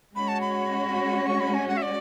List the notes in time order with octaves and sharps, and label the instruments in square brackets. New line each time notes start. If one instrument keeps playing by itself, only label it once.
[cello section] G#3 C#4 F#4 C#5 [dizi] B5
[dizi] A5
B5
C#6
B5
G#5
F#5
E5
D5